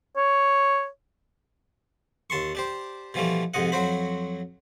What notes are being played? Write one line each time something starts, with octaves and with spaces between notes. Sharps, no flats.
C#5
D#2 A5 C6 C#6
D4 G4 C5
B2 E3 F3 G3 A3
F2 G#2 C3 D#5 F#5
F2 F#3 F#4 C5 B5